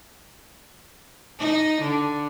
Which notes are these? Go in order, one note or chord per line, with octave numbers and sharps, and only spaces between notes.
D#4
D3